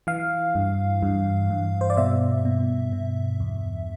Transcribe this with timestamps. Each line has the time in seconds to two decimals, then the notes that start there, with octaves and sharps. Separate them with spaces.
0.07 E3 F5
0.55 G2
1.03 G2
1.50 G2
1.81 C5
1.90 D5
1.97 B2 E5
2.45 B2
2.92 B2
3.40 E2